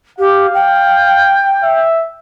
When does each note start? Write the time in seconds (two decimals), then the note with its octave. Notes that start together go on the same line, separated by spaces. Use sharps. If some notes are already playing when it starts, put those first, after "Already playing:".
0.19 G4 F5
0.54 G5
1.63 E5